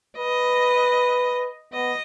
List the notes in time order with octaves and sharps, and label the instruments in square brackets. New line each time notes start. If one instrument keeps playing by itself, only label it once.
[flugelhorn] B4 [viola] D#5
[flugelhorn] B3 [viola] D#5